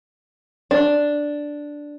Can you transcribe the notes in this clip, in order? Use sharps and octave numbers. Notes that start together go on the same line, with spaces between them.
D4